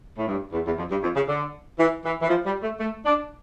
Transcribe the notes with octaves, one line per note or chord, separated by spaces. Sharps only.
A2
G2
E2
E2
F2
G2
F2
C#3
D3
E3
E3
E3
F3
G3
A3
A3
D4